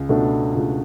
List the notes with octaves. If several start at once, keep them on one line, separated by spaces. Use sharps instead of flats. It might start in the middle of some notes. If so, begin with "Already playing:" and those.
Already playing: C#2
B2 A3 D4
C#2